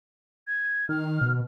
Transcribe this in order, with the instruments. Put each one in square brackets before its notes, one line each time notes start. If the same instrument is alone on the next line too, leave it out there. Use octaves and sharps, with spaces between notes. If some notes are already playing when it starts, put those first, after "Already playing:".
[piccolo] G#6
[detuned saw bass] D#3 [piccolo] F6
[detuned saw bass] B2